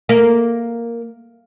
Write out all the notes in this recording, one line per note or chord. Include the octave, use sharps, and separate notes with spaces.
A#3